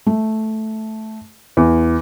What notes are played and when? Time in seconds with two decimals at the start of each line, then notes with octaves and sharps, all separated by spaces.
0.06 A3
1.57 E2